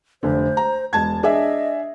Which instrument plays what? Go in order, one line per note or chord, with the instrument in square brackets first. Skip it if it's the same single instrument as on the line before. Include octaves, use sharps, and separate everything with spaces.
[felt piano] F1 D3 [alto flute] C5
[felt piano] A#5
[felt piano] E1 A5 G#6 [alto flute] G#3
[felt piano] D4 G#4 E5 [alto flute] D#5